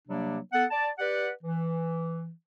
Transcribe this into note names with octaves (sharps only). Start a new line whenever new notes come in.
C3 F#3 G3 A#3 D4
B3 A4 F#5
D5 A5
G4 B4 D5 F#5
E3